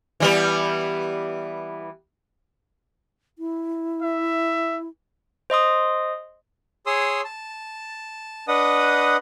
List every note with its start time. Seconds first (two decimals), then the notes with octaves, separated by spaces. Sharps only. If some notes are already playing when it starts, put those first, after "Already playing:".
0.20 E3 G3 B3
3.39 E4
4.02 E5
5.50 C5 D#5 C6 D#6
6.86 G#4 C#5 C6 D#6 E6
7.25 A5
8.48 D4 B4 D#5 F#5 D#6